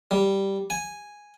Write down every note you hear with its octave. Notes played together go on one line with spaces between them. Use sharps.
G3
G#5